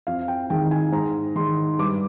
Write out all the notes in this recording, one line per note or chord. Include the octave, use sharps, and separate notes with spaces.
F2 F5
G5
D#3 G#3 G5
G#5
G#2 A#5
D#3 G#3 C6
G2 D6